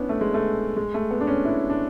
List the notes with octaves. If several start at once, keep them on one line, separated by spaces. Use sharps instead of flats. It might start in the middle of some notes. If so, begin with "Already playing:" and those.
Already playing: B3 C#4 D4 E4
A3
G#3
A3
G#3
A3
B3
D4
C#4
E4
D4